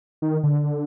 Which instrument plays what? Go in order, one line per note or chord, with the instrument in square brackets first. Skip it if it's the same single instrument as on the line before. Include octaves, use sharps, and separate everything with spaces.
[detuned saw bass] D#3
D3